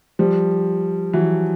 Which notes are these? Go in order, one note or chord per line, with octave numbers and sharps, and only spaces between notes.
F3 G3
E3 F#3